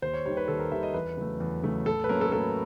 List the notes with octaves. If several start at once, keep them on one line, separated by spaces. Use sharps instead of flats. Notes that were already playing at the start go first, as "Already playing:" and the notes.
D#2 C5
C#5
D#3 G3 C#5
B4
D#2 A4
A#4
D#3 G3 E5
D#5
E2 B4
C#3 F#3 A3
E2
C#3 F#3 A3
A2 A4
B4
F#3 A#3 C#4 A#4
A4
A2 A4